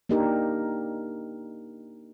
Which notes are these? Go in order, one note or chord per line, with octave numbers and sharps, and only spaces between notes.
A#3 D4 D#4 G4 A#4